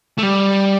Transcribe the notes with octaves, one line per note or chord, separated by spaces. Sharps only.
A3
G3